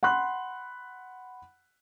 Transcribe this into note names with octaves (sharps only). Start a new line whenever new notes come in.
F#5 B5 C6 F#6